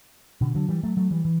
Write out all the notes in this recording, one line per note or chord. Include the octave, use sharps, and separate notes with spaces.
B2 D3
D3 F#3
E3 G3
F#3 A3
F#3 A3
E3 G3
E3